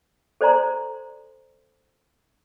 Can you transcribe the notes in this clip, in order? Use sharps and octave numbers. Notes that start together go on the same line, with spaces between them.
A4 C5 D5 G#5 A#5 C6